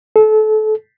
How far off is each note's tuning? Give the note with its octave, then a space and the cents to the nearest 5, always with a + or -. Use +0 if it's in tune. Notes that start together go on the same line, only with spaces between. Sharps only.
A4 -30